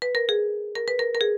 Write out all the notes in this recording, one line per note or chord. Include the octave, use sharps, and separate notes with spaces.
B4
A#4
G#4
A#4
B4
A#4
A#4
G#4